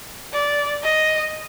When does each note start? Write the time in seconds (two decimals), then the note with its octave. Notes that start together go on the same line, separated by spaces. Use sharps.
0.33 D5
0.83 D#5